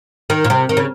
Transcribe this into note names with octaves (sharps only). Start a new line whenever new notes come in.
D#3
A#2
C3
D#3
C#3